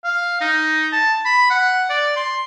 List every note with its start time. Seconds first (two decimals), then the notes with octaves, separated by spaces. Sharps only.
0.04 F5
0.41 D#4
0.92 A5
1.25 B5
1.50 F#5
1.89 D5
2.16 C6